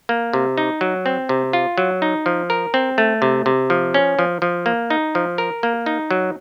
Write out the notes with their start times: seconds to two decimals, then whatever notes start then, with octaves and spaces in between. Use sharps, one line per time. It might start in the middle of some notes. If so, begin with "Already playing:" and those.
0.09 A#3
0.33 C3
0.58 D#4
0.81 F#3
1.06 C4
1.29 C3
1.53 F4
1.78 F#3
2.02 D#4
2.26 F3
2.50 A#4
2.74 C4
2.98 A3
3.22 C3
3.46 C3
3.70 F3
3.94 C#4
4.19 F3
4.42 F3
4.66 A#3
4.90 D#4
5.15 F3
5.38 A#4
5.63 A#3
5.86 D#4
6.11 F#3